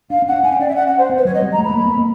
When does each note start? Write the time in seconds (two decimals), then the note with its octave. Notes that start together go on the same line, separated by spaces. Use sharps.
0.10 D4 F5
0.22 C#4
0.28 D4 F#5
0.43 C#4 G#5
0.51 G5
0.60 C#4 D5
0.68 E5
0.76 F#5
0.87 F#5
0.98 C5
1.09 C4
1.17 B4
1.25 F#3 C#5
1.34 D#5
1.42 G3
1.53 A#5
1.58 A3
1.64 B5
1.70 A3
1.74 A#3
1.86 B3
1.97 A#3